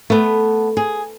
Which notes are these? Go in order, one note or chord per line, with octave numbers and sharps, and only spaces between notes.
A3 B3
G#4